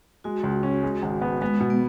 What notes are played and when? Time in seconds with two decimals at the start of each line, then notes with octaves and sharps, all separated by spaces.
0.24 G#3 F#4
0.44 C#2
0.63 C#4
0.83 G#3
1.02 G#1
1.22 B3
1.41 G#3 B3
1.60 B2
1.70 B3